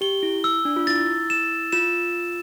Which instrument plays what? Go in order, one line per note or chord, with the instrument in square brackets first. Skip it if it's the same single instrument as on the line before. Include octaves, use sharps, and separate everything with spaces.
[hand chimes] G4 [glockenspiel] G7
[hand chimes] E4
[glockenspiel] E6
[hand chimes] D4
F4
[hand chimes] E4 [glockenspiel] A6
[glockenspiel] E7
[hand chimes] F4 [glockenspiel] E7